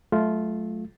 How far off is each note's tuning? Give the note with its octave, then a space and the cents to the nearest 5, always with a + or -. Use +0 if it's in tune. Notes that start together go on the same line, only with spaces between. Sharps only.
F#3 +0 A3 -20 F4 +0